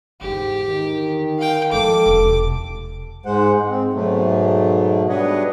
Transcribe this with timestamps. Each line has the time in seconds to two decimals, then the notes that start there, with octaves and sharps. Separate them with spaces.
0.21 E2 G#2 D3 G4
0.66 D#3
1.39 F5 G5
1.72 F3 G#3 A4 D6
2.06 E1 C3
3.26 G#2 G#3 C5 F#5
3.69 C4
3.93 G#2 B2 F#3 A3
5.09 G3 D4 B4 C#5 D#5 F#5